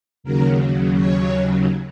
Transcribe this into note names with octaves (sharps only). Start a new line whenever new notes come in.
D#2 C#3 F#3 A#4
C#5